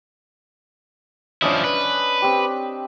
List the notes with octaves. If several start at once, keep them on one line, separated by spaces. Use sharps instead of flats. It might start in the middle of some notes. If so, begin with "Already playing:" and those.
F3 C#4 D4 E4 D#5
B4
C4 G4